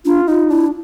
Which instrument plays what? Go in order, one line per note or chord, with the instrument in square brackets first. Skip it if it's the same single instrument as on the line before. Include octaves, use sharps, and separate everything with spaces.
[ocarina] D4 [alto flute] F4
[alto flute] D#4 [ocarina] F4
[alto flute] D4 [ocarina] E4